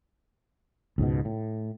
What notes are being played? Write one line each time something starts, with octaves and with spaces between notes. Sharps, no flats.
C#2 G#2 B2
A2